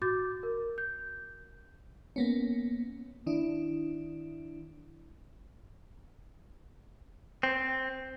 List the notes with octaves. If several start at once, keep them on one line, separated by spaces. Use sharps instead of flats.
F#4 D6 G6 A6
A#4
G6
A#3 B3 C#4
D#3 D4 E4
C4